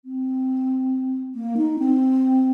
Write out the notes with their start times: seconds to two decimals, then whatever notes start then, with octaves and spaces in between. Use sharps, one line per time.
0.05 C4
1.35 A#3
1.57 D#4
1.79 C4